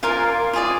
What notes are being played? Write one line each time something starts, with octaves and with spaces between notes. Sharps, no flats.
F4 A#4 D5 F5 G#5
F4 G#4 D5